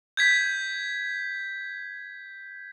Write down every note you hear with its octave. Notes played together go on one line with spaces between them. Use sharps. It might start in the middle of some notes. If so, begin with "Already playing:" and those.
G6 G#6 B6